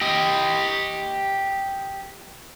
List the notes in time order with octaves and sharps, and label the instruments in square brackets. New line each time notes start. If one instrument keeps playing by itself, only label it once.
[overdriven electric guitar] G4 D#5